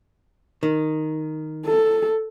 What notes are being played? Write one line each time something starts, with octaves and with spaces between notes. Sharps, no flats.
D#3
A4